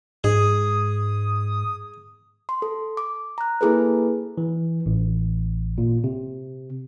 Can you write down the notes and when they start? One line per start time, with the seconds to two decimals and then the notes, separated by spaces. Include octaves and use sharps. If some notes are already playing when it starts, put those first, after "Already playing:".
0.24 G#2 G#4 D#6
2.49 C6
2.62 A4
2.97 D6
3.38 A#5 F#6
3.61 A#3 E4 G#4 A4 B4
4.38 E3
4.86 A1
5.78 A#2
6.04 C3